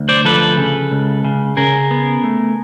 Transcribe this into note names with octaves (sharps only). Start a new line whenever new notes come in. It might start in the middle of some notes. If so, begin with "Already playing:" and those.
Already playing: D2
C5 D5
F3 A4 B4
C#3
C#2
C#3
C#3 G#4 A#4
B3
A3